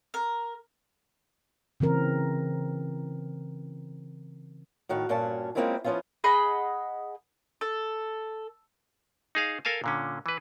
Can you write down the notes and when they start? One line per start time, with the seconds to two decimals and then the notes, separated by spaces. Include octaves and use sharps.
0.14 A#4
1.80 C#3 E3 C4 A#4
4.89 A2 D#3 F#4 F5
5.09 G2 A#2 C#4 F#4 A5
5.55 G#3 A#3 C4 C#4 E4 F4
5.84 F3 B3 C#4 E4 F4
6.24 G#4 D#5 F#5 B5
7.61 A4
9.35 D#4 G#4 F5
9.65 A4 A#4 F5 G#5 A5
9.84 A#2 D3 C#4
10.26 E3 B4